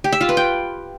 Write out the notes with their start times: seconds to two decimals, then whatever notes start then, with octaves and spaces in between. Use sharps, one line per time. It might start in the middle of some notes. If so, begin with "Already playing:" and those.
0.04 G4
0.12 E5
0.21 F4
0.29 B4
0.37 G5